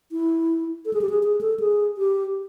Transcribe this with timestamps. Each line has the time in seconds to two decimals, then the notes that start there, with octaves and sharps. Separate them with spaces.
0.12 E4
0.85 A4
0.93 G#4
1.01 G4
1.09 G#4
1.23 G#4
1.41 A4
1.60 G#4
1.97 G4